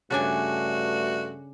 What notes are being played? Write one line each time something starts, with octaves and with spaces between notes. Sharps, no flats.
G2 C#3 A3 D4 F#4 G#5